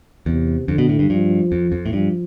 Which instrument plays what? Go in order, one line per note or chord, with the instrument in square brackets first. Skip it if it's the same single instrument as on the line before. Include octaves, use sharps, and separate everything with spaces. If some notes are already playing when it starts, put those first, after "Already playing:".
[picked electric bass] E2 [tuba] C3
[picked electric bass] F2 [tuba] D3
[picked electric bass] B2
A2
G2
[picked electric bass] G2 [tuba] F3
[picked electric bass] F2
F2
A2
[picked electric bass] G2 [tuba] F3